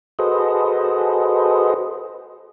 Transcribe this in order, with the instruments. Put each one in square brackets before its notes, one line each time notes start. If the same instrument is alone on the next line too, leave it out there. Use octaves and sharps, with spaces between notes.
[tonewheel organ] F#4 G#4 A4 B4 C5 D#5